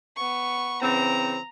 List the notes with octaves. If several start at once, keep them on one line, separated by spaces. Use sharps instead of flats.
B3 C#6
C#3 E3 C4 A#5